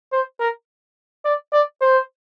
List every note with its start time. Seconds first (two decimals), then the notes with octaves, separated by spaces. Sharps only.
0.12 C5
0.40 A#4
1.25 D5
1.53 D5
1.81 C5